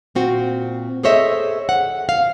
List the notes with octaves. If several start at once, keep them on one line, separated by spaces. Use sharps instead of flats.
A#2 C4 F#4
G#4 A4 C5 C#5 D#5 E5
F#5
F5